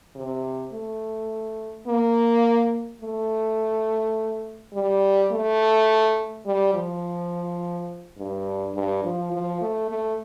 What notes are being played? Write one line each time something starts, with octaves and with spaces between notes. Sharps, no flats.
C3
A3
A#3
A3
G3
A3
G3
F3
G2
G2
F3
F3
A3
A3